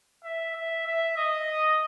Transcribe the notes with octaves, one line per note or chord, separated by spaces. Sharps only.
E5
E5
E5
D#5